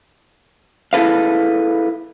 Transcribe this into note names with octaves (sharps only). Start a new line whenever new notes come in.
E4 G#4 A4 B4 F5